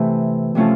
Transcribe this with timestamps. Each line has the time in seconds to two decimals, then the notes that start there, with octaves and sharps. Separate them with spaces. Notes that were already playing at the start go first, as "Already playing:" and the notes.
Already playing: C3 E3 A3
0.55 C3 F3 A3 C#4 F4